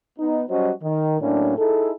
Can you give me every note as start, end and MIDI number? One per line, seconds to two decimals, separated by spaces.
0.17 0.42 59
0.17 0.42 63
0.49 0.71 54
0.49 0.71 55
0.49 0.71 61
0.49 0.71 66
0.49 0.71 72
0.49 0.71 75
0.82 1.15 51
1.21 1.54 45
1.21 1.54 54
1.21 1.54 58
1.21 1.54 61
1.21 1.54 62
1.57 1.91 63
1.57 1.91 64
1.57 1.91 68
1.57 1.91 69